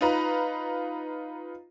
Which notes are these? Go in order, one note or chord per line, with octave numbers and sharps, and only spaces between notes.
D#4 F4 B4 A#5